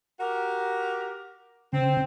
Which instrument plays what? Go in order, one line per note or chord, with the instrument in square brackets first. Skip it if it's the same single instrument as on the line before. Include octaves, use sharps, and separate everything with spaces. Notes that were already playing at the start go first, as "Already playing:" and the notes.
[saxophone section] F#4 G4 A#4
[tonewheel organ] C#3 [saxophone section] C4